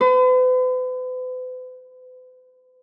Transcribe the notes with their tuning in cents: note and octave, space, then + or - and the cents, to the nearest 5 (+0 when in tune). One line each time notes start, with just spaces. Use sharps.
B4 +45